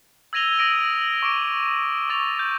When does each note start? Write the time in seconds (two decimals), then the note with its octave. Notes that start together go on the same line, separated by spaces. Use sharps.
0.33 E6 G#6 A#6 D#7 F7 G7
0.58 D#6 A#6 D7 D#7 F#7
1.22 C#6 D6 D7
2.09 C#6 A6 F7
2.39 G6